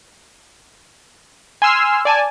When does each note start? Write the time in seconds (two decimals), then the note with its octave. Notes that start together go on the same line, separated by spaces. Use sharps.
1.62 G#5 C6 E6 F6 C7
2.05 D5 G#5 A5